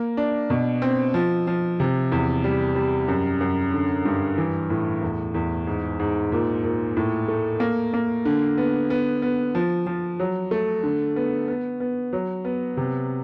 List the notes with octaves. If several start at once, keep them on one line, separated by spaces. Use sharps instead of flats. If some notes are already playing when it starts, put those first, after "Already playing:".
Already playing: A#3
D4
B2
C4
F3
F3
C3
E2
G3
G3
F#2
F#2
D3
G2
E3
A2
E2
E2
G#2
G#2
A#2
A#2
A2
A3
A#3
A#3
D3
B3
B3
B3
F3
F3
F#3
A3
D3
B3
B3
B3
F#3
B3
C3